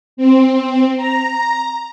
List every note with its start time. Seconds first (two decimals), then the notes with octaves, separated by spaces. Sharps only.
0.17 C4
0.97 A#5